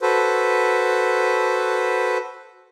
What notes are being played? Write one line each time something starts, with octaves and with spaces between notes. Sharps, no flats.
F#4 A4 B4 C5